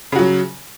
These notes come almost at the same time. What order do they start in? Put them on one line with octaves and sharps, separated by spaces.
C#3 F#4 F#3